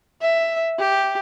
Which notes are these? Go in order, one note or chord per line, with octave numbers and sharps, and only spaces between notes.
E5
G4